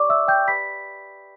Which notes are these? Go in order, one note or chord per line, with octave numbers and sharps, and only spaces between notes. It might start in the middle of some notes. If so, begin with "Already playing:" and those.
Already playing: G4 C#5 D5 C#6 D6
E5 E6
G5 G6
G4 B4 D5 B5 B6